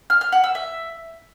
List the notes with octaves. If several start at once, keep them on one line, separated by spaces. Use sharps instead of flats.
F6
F6
F#5
E6
E5